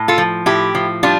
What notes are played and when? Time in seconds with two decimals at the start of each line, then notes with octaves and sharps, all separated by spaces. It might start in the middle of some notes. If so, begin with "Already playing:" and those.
Already playing: A2
0.08 F4 A4
0.18 F3
0.46 A2 E4 G4
0.75 F3
1.03 G3 D4 F4